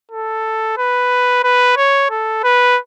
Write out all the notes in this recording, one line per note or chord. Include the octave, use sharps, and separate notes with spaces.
A4
B4
B4
C#5
A4
B4